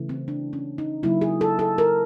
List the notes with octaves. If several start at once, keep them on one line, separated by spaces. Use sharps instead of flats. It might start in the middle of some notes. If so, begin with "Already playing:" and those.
Already playing: C#3 E3 A3
C4
D4
C#4
D#4
C#3 F#3 A#3 E4
G#4
A4
A4
A#4